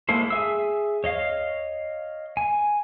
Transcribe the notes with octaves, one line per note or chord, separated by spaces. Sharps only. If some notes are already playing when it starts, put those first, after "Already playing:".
G#3 A#3 E4 A4 C5
G#4 E5 E6
C#5 D#5 F5
G#5